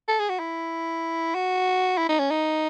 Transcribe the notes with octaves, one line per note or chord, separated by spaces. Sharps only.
A4
G#4
F#4
E4
F#4
E4
D#4
C#4
D#4